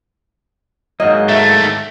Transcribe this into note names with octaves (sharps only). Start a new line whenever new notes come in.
G#2 F#3 A#3 D#5
D#3 A3 E5